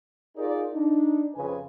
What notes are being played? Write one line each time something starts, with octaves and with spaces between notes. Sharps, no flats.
D#4 F4 G#4 A#4 D5
D4 D#4
F2 C#3 B4 G#5